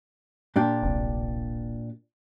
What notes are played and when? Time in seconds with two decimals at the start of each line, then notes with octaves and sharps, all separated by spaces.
0.56 A#2 D4 G4
0.83 D1 A#1 C3